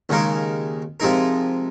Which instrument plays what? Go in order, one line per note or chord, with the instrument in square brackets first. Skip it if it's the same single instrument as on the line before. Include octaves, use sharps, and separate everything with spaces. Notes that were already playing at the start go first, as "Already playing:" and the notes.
[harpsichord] D#2 C#3 G#3 D#4 A#4
C3 F3 G#3 D#4 A#4